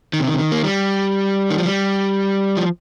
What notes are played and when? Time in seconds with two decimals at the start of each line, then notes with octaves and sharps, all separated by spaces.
0.13 D#3
0.20 C3
0.28 D#3
0.34 C3
0.39 D#3
0.52 A#3
0.64 G3
1.50 D#3
1.58 F3
1.66 G3
2.57 F3